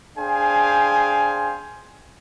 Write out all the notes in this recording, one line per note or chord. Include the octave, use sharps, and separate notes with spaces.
D4 G#4 C5 F5 G5 G#5